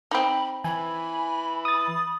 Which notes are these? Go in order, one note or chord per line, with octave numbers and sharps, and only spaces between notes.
C4 D#4 B5
E3 G#5 B5
D#6 A6